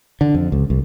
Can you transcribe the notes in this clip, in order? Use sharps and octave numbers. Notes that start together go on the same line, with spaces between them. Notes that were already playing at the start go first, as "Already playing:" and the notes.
D3
F2
C#2
C2